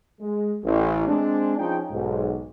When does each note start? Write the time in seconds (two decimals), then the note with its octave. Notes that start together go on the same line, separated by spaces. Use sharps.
0.21 G#3
0.63 A1
1.07 G#3 C4 D4
1.58 F3 C#4 D#4 F4 G#4 G5
1.91 B1 G#2